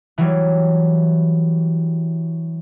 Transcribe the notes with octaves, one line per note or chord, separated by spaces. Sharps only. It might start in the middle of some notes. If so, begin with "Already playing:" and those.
E3 F#3 G3